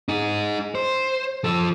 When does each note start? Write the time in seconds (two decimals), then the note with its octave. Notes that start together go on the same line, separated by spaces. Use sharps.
0.09 D#4 G#4
0.75 C5
1.44 F3 A4